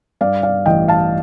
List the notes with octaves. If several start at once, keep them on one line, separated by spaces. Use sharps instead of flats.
G2 D5 F5
D5 F5
A1 D#5 G5
F5 A5